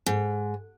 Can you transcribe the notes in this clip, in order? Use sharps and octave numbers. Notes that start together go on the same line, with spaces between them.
G#2